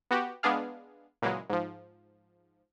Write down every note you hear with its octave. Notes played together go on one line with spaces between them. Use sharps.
B3 F#4 G4
G#3 B3 D4 G#4 F5
A#2 C#3 E3 F#3 G#3
G#2 F3